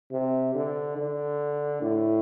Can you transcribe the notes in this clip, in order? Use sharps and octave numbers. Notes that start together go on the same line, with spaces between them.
C3
D3
D3
A2